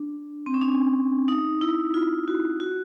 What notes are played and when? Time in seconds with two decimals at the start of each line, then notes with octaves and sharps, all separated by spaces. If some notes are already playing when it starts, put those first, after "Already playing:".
Already playing: D4
0.46 C4
0.54 C#4
0.61 D4
1.28 D#4
1.61 E4
1.94 F4
2.28 F#4
2.60 F#4